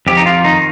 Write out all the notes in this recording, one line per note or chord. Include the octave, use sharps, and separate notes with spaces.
F2 G4
D#4
F4
D#3 D#4